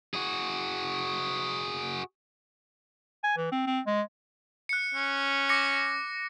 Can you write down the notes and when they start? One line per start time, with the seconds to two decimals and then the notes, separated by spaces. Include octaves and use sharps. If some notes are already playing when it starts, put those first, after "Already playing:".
0.14 F#4 G#4
3.23 G#5
3.37 E3
3.52 C4
3.66 C4
3.87 G#3
4.69 F#6 C#7
4.95 C#4
5.49 D6 A#6 C#7